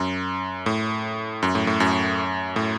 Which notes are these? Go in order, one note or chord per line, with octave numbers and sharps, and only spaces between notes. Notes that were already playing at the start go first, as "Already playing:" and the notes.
Already playing: F#2
A2
F#2
A2
A2
F#2
A2